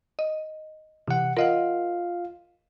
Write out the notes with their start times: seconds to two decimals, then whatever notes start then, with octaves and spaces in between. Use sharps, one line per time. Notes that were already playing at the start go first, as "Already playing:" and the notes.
0.19 D#5
1.08 C3 E3 F#5
1.37 F4 A#4 D#5 F5 F#5